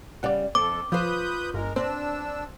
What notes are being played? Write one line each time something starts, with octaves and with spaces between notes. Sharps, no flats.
C#3 G3 D5 F#5
F2 C4 A4 D6
F3 F4 B4 C5 D#6 G6
G1 G#3 A#4
C4 D4 C5 E6